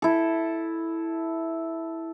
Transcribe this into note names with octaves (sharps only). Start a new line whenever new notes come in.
E4 A4